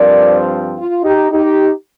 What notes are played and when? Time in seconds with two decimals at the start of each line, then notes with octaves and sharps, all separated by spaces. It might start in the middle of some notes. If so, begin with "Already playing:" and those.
Already playing: G2 F3 C4 A#4 D5
0.77 F4
1.04 D#4 G4
1.33 D#4 G4